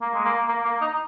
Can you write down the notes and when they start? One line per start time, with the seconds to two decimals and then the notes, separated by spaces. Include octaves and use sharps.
0.02 A#3
0.14 G#3
0.25 A#3
0.48 A#3
0.65 A#3
0.81 D#4